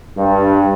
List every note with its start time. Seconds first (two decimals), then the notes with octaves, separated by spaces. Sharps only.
0.17 G2